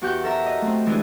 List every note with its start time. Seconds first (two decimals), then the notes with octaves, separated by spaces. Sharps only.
0.01 E2 F#4 G4 F#5 G6
0.24 A4 A#4 E5 A#5
0.46 D#5
0.62 A3 C4
0.86 E3 G#3 D4 E4 G#4